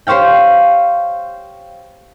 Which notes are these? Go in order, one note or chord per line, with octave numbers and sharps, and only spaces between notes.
G4 C5 C#5 F5 G5